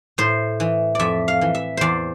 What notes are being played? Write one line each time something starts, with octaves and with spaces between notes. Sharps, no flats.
A2 C5
E3
F2 D5 E5
F5
E3
E5
E2 C5 D5